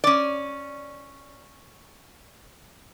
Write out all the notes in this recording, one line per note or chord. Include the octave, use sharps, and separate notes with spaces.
C#4 D5